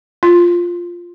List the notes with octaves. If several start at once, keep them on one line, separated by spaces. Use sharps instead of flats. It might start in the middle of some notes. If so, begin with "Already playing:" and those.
F4